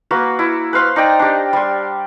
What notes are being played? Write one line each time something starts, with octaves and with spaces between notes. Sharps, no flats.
A#3 F#4 B4
E4
B4 C5 F5 C6
D#4 D5 G5 A#5
D4 G4
G3 C6